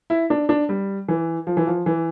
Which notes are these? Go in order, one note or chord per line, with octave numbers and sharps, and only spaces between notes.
E4
D4
D4
G3
E3
F3
E3
F3
E3